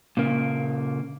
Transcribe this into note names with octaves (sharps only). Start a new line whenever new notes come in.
A#2 C#3 A#3